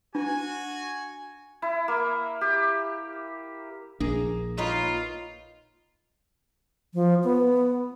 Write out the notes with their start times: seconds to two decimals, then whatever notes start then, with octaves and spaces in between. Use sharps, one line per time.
0.15 D4 F#4 G#5
1.62 E4
1.88 A#3
2.41 G4
4.00 A#1 A#3 D4 G#4
4.58 D#4 F4 B4 C#5
6.94 F3
7.24 B3